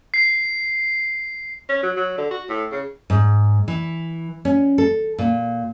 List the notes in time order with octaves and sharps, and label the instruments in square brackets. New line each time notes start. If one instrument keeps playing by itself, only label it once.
[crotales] C7
[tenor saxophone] C#4
F#3
F#3
D3
F#4
A2
C#3
[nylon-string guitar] G#2
E3
C#4
A4
A#2